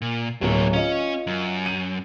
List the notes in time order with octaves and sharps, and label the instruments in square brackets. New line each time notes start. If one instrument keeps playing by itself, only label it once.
[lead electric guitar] A#2
[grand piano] D1 F#3 [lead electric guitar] A2 A#3
[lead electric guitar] C#4 [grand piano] F4 D#5
[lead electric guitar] F#2
[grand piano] D#7